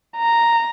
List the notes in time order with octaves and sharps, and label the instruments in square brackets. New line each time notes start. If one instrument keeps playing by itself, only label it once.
[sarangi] A#5